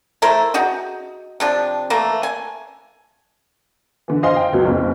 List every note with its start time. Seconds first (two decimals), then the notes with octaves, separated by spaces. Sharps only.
0.22 A3 E4 A#4 C5
0.54 D#4 F#4 G#4
1.40 C3 F3 D4
1.90 E3 A3 A#3
2.23 G#5
4.08 D3 E3
4.23 C5 D#5 F5 G#5 C6
4.36 F5 G5
4.53 C#2 B2 F#3
4.65 F#1 F2 C#3